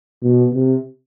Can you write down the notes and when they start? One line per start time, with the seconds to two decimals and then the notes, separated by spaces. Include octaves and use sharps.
0.23 B2
0.54 C3